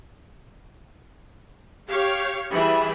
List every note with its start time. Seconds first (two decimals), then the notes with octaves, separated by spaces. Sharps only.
1.88 G4 C#5 F5
2.51 E3 G3 G#4 E5 B5